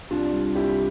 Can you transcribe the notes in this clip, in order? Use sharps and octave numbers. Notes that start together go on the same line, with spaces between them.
C2 D4 F4
G3
C2 E4 G4